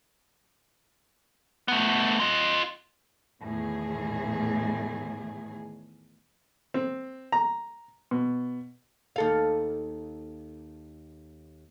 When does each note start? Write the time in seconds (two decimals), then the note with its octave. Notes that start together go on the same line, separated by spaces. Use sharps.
1.68 A3 B3
2.20 F4 D#5
3.43 E2 A2 D#3 G#4
6.74 C4
7.32 A#5
8.11 B2
9.16 D#2 A4 F5